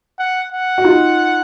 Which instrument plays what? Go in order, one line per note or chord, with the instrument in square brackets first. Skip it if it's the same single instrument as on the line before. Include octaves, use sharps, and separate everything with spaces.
[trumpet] F#5
F#5
[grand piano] F#4
D#4 F4